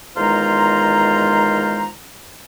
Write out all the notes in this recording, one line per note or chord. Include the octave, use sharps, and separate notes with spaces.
E2 D#3 G#3 F4 C5 A#5